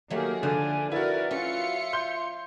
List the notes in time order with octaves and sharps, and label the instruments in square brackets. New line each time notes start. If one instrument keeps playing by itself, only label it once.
[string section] D#3 A#3 G#4 [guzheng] F#3 A3 [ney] G4
[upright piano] D3 [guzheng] F3 [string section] D4 [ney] G#5
[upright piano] E4 F#4 [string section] A#4 B4 [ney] D5
[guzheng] C#4 [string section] F4 C#7 [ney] E5
[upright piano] C6 G6